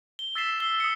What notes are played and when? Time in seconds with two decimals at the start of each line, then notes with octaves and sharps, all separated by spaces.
0.19 G7
0.35 E6 A6 B6 C7 E7 G7
0.60 E6 G7
0.80 D#6 C7 C#7